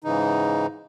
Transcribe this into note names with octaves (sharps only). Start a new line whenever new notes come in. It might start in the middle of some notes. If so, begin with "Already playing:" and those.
G#2 C#3 E3 D#4